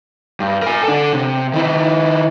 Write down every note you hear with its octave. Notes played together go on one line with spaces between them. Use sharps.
G2
A#4 G#5
D4 A4
C3
D#3 E4